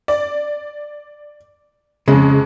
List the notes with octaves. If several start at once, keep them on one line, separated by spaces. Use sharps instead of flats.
D5
F2 C#3 G#3